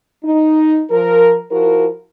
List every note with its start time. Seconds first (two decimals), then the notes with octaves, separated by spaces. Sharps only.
0.24 D#4
0.90 F3 A#4
1.50 F3 E4 F#4 A#4